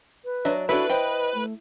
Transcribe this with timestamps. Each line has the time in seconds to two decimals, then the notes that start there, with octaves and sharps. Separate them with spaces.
0.25 B4
0.45 F#3 D4 D#5 E5
0.69 D4 E4 F#4 A4 B4 E5
0.90 C5 D#5 G5
1.35 A3